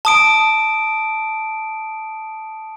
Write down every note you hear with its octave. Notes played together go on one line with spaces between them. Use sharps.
A5 D#6 D7